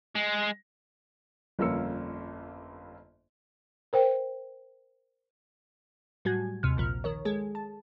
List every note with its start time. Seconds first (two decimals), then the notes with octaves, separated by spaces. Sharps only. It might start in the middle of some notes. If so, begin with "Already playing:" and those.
0.15 G#3
1.59 G1 F2 A#3 C#4 E6 C#7
3.93 A#4 C5 G5
6.25 A2 F#3 G3 F#4 G#5 G#6
6.63 D#2 C3 F6
6.77 A#1 A#2 F3 F6
7.04 D#3 A#4 C#5
7.25 G#3 G#4 A4
7.55 A5